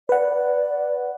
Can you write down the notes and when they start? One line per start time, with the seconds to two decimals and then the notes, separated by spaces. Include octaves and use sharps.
0.09 B4 D5 F#5